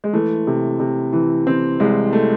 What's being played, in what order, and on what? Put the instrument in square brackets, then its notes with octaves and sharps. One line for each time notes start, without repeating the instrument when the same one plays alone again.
[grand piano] G#3
E3 A3
C3
C3
E3
E3 C4
C2 G#3
A3